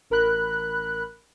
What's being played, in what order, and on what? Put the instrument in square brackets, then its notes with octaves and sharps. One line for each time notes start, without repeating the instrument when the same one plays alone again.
[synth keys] A1 A#4 B5 F#6